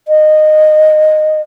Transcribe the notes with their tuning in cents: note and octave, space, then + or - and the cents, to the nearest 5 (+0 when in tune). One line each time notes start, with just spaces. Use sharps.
D#5 -15